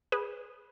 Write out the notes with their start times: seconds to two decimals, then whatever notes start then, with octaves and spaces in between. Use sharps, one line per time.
0.12 G#4 B4